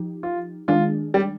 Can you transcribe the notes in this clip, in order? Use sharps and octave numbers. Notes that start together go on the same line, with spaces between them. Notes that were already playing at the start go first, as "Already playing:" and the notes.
Already playing: F3 D#4 G4
F4
D#3 G#3 D4 F4 G#4
G3